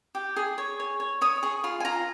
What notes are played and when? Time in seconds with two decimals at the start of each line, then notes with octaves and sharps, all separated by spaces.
0.15 G4
0.36 G#4
0.58 C#5
0.80 C#5
1.00 C#5
1.21 C#5 D#6
1.43 G#4 C#6
1.64 F4 C6
1.80 G#5
1.85 F4 A#5